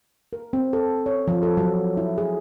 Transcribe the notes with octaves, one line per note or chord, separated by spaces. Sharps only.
A#4
C4
A4
C#5
F3
A4
F#3
E4
G#4